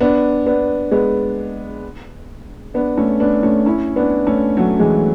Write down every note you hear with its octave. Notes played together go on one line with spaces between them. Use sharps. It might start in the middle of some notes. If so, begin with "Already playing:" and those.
B3 D4
B3 D4
G#3 B3
B3 D4
A3 C#4
B3 D4
A3 C#4
C#4 E4
B3 D4
A3 C#4
F#3 A3
E3 G#3